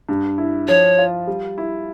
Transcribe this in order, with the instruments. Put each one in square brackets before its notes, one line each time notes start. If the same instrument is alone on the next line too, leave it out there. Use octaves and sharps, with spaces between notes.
[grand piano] G2
E4
[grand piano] F3 [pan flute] C#5
[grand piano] F4
G3
E4